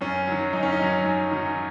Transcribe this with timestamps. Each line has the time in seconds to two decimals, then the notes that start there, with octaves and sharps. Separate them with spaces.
0.01 F#2 C#4
0.27 D#3 F#3
0.53 F#2 D#4
0.63 C#4
0.73 D#4
0.79 D#3 F#3
1.05 F#2
1.31 D#3 F#3